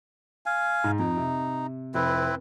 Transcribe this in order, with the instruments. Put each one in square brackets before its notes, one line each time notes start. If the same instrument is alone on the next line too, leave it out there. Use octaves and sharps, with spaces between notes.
[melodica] F5 G#5
[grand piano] G#2
[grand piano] F2 [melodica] D#4
[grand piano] C3
[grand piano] F1 [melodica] C4 E4 B4